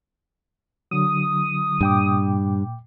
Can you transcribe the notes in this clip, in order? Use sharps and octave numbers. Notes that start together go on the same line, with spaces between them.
D3 F#3 D#6
G2 A#2 G5 D6